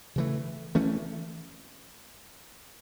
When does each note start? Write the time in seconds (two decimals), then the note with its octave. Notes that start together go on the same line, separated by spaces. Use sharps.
0.16 C#3 E3 A3
0.75 E3 A3 C#4